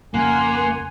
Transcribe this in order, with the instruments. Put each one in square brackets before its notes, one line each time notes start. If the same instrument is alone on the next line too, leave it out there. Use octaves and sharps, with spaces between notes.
[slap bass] F2 C#3 [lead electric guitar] A#3 [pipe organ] F#5 C6 [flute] G#5